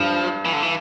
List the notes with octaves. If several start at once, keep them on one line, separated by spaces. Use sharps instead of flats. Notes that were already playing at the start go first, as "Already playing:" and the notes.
Already playing: G2 F3
E3
D3
E3